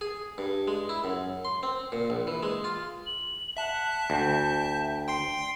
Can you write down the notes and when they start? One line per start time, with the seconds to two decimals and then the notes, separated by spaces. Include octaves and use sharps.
0.01 G#4
0.38 G2
0.68 G#3
0.89 E4
1.04 F#2
1.45 C6
1.63 C4
1.92 A#2
2.10 A#1
2.27 E3
2.43 G#3
2.64 F4
3.05 F#7
3.57 E5 F#5 A5
4.10 D2 G5
5.08 G5 C6 C7